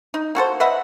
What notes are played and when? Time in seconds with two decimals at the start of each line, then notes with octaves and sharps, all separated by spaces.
0.14 D#4
0.35 A#3 F#4 A4 C5
0.60 B4 D#5 E5 F#5